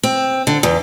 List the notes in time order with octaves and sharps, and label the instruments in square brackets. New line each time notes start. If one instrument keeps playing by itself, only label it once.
[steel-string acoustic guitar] C4
D3
E2